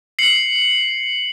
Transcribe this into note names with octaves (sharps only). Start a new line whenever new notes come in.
C7 C#7 F#7